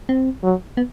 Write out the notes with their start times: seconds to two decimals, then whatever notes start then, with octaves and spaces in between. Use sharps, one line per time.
0.09 C4
0.43 F#3
0.77 B3